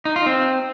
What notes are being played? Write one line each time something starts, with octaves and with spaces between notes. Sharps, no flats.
D#4
F4
C4